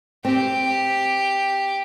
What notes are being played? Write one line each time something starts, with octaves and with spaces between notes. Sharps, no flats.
C4 G4